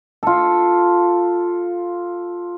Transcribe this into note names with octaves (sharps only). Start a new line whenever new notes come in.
F4 A4